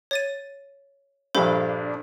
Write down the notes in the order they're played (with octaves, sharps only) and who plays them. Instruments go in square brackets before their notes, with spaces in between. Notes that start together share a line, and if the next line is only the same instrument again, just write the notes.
[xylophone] C#5 A6 D#7
[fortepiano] A#1 G2 [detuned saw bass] D4 [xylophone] A4 C5 B5